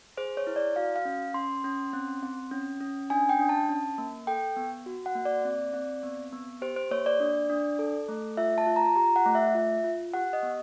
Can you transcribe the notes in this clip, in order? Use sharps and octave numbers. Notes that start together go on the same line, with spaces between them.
G#4 C5
C#5
E4
D5
F#4 F5
F5
C#4
C#4 C6
C#4
C4
C4
C#4
C#4
D4 G#5
G5
D4
A5
C#4
A#3
A4 G5
B3
F#4
F#5
A#3
D5
C4
C4
B3
B3
G4 C5
C5
A#3 C#5
D5
D4
D4
A4
A3
F4 E5
A5
F4
A#5
G4 A#5
F#5
A3
E5
F4
F4
G4 F#5
D#5
B3